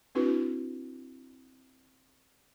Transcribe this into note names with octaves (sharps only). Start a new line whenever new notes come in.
C4 D4 E4 F#4 B4